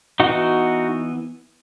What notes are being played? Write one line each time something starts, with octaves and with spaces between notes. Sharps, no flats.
E3 B3 D#4 F#4